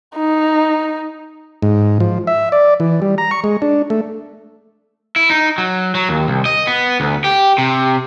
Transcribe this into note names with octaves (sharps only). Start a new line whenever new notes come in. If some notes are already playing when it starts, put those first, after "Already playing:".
D#4
G#2
F3
E5
D5
E3
G3
A#5
C#6
G#3
D4
A3
E4
D#4
F#3
F#3
D#2
C2
D#5
B3
D2
G4
C3